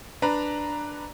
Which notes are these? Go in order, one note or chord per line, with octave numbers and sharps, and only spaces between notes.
D4 B4 A#5